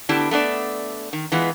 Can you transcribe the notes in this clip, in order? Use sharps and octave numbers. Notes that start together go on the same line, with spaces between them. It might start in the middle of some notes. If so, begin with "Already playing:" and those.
D3 A3 B3 D4 E4 G4
A3 B3 D4 D5
D#3
E3 G#3 B3 F4